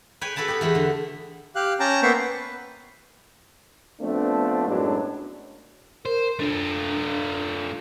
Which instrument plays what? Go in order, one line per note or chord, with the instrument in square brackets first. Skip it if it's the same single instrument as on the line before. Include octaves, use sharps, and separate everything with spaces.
[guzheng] B4 C#5 G5 G#5
F#4 A4 B4 A5 B5
B3 G4
E2 A3 F#4 B5
D3
[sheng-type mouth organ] G4 F5 F#6
C#4 G5 A5 A#5
A#3 B3 C5 E5 G5 C#6
B4
[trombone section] F3 A3 B3 C4 D4
F#2 A2 F#3 G#3 B3 D4
[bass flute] A#4 [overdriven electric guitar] C5
[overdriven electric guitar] A3 F4 [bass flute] D4